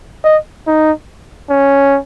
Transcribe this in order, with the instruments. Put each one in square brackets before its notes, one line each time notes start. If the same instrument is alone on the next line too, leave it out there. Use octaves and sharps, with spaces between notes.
[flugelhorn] D#5
D#4
C#4